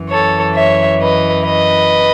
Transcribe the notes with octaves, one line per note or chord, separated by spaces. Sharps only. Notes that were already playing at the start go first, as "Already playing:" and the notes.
Already playing: F#2 E3
A4 C#5
C#5 E5
B4 D#5
B4 D#5